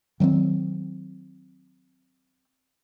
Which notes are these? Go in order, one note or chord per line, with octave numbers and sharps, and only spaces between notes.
D#3 F#3 A3 C4